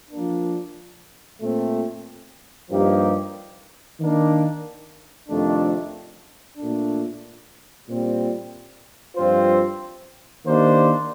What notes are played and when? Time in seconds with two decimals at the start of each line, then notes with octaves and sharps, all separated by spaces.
0.10 F3 A#3 D4
1.40 A#2 A3 C4
2.69 G2 F3 A#3 D#4 G4
3.99 D#3 A#3 D4
5.28 F2 C3 D#3 A3 D4
6.57 A#2 A3 D4
7.87 A#2 G3 C4
9.16 G2 F3 C4 F4 C5
10.45 D#3 A#3 D4 G4 C5